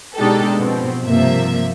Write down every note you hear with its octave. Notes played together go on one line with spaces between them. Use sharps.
B2 G#3 D4 D#4 G4 A4
B2 F3 C4
G2 C3 F3 A#3 E5